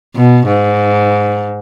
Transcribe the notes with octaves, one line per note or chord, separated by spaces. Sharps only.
B2
G#2